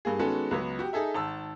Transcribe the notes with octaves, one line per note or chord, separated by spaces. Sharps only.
G2 A#3 G#4
D#3 G#3 B3 C#4 F#4 A4
C#2 F#3 B3
F#4 G4
D#4 G#4 A4 E5
G#1 A5 E6